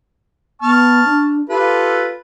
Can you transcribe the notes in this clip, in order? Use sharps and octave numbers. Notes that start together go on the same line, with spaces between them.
B3 A5 C#6 F6
D4
F4 G4 A4 B4